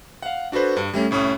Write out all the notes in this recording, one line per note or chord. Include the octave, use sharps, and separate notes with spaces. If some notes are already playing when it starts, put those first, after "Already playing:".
F5 F#5
D4 F#4 A4 B4 C5
G2
G3 A3 C#4
C2 A2 C#4 C#6 D#6